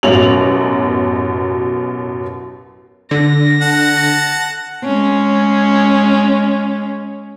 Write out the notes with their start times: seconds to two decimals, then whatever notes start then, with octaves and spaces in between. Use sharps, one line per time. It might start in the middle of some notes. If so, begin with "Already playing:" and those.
0.03 A1 F#2 B2 F#3 F7 F#7
3.11 D3 A#6
3.61 F#5 A5
4.84 G#3 C#4